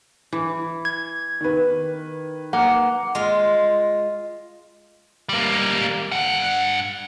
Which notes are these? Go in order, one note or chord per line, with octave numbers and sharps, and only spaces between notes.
E3
G#6
D#3 B4
A#3 F#5
G#3 F4
G3 A#3
G2 F#5